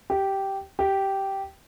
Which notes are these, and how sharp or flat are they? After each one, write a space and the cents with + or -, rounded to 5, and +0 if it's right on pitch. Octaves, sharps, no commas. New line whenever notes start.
G4 -10
G4 -10